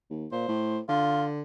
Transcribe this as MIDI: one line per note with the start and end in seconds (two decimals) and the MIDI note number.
0.10 0.26 39
0.32 0.44 46
0.32 0.80 72
0.48 0.79 45
0.89 1.42 50
0.89 1.24 65